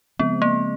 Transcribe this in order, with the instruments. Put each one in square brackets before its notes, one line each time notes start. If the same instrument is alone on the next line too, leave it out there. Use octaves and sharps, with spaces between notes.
[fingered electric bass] C#3 F3 G#3 C4 [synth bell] B3
[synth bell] A#3